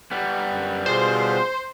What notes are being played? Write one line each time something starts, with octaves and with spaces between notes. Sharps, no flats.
G3 B3
F#2
B2 F4 G#4 C5